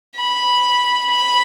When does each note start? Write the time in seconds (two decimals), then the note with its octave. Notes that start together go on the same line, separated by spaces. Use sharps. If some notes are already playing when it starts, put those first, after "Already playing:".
0.16 B5
1.10 B5